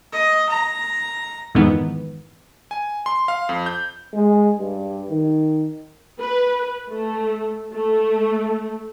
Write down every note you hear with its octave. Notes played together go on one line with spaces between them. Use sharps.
D#5
A#5
F2 G#2 D#3 E3 B3
G#5
C6
F5
F2
G6
G#3
G2
D#3
B4
A3
A3